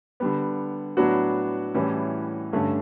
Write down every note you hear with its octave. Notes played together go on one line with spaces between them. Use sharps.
D3 G3 B3
A2 F#3 B3 D4 F#4
A2 E3 G3 C#4
G2 D3 A3 C#4